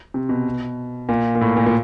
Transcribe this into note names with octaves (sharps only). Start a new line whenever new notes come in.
C3
B2
A#2
A#2
A2
A#2
A#2